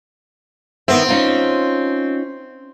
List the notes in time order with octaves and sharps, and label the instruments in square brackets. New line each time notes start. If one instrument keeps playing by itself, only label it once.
[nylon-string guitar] D#3 B3 E5 [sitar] C4
[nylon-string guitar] C#4 D#4 F4